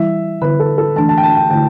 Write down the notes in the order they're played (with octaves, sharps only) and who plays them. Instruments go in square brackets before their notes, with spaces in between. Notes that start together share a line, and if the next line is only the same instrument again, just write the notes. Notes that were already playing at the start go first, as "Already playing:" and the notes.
Already playing: [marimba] E3 G3 E4 [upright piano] E5
[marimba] D3 B3 E4 [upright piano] B4
[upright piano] A4
A4
[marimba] E3 A3 D4 [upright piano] A5
[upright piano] A5
G5
A5
G5
[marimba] D3 A3 E4 [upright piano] G5